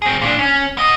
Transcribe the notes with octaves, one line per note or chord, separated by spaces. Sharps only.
C4 G#4
A#2 D4
C#4
B3 D#5